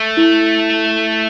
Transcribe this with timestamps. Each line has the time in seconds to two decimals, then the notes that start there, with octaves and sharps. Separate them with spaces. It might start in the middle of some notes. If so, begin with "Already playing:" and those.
Already playing: A3
0.17 E4